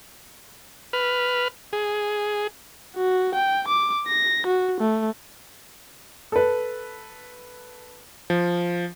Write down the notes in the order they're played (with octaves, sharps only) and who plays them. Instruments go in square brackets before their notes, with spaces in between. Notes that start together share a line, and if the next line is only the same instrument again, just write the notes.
[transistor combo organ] B4 F6
G#4
[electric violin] F#4
G5
D6
A#6
F#4
A3
[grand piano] A4 B4
[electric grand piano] F3